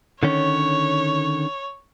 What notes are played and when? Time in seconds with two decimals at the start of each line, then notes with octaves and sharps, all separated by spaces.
0.23 D3 D#3 C#4 C#5